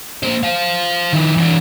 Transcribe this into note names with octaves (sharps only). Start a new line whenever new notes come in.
A#3 C5
C5 F5
D#3 E4
E3 D4